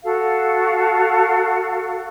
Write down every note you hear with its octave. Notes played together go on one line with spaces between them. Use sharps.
F#4 A4 F5